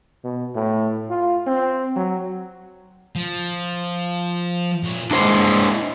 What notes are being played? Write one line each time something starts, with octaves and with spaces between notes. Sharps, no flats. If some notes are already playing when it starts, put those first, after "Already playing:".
B2
A2
F4
C4
F#3
F3
A#2 C#5
A#2 G#3 D4 E4 C5